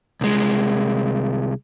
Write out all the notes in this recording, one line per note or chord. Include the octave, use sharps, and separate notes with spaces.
C2 G#3